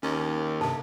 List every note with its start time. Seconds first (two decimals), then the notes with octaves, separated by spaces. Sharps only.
0.03 D#2 C#4
0.61 G2 C3 A4 A5